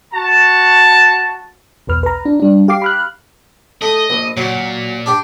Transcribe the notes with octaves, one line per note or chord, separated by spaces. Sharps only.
F#4 A5
B1 E2 B4 F6
B4 A#5
D4
G3 D4
G4 F5 D6 C7
B5 F6 F#6
A3 D#5
A#1
A#2 F#3
D4 G4